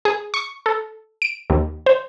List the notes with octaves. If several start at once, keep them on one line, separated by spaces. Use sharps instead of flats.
G#4
C#6
A4
D7
D#2
C5